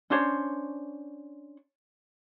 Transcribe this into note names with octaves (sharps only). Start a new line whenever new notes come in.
C#4 D4 C5 C#5